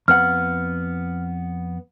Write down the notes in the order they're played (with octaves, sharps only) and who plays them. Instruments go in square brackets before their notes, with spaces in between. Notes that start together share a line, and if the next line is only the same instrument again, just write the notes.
[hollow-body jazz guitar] F2 B3 F#5 [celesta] F6